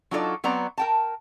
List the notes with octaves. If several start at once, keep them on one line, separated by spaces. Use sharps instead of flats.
F#3 D4 D#4 F4 A4 D5
F#3 B3 C4 D5 A#5
A#4 G5 A5